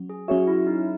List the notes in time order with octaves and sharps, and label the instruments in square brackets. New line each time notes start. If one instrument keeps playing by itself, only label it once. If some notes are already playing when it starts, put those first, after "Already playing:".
Already playing: [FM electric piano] F#3 C#4
[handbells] G#4
[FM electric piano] F#3 C#4 G#4 C#5 E5 [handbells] F#4
[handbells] E4
D#4